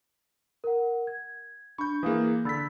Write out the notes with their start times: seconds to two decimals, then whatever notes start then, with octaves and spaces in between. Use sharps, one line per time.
0.64 A#4 F#5
1.07 G#6
1.78 D4 B5 C#6 G6
2.03 E3 A#3 G#4 F5 D#6
2.45 D3 B5 E6 A6 B6